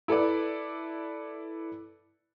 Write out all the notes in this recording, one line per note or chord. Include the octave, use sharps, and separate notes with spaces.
E4 A4 B4 D5